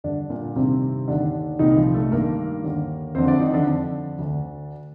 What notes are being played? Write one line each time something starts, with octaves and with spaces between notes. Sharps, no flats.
G2 D3 D4
A#2 A#3
G2 C3 D#3 C4
D#2 D3 D#3 D4
C2 A#2 D#3 D#4
F3 F4
A3 A4
G2 D#3 A#3 A#4
D#2 D3
F2 D3 C4 C5
D4 D5
D#3 D#4
D3 D4
F2 D3
D2 D3